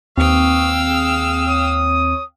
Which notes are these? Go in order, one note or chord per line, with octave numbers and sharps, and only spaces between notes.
D#2 C4 B4 F5 G5 C#6 D#6 E6
G#4 D#6
C#5 D#6